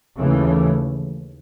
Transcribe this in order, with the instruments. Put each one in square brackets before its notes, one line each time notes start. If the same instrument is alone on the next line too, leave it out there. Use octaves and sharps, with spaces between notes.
[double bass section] D#2 C#3 E3 A3